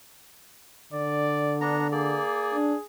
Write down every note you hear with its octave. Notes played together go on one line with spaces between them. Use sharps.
D3 D5
B3 D4 A#5
A#3 G#4 D5
D4